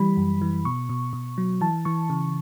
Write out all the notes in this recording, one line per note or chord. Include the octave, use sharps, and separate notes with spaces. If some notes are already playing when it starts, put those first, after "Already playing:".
Already playing: E3 G3 B5
F#2
E3
B2 C#6
B2
B2
F#3
E3 A5
E3 C#6
C#3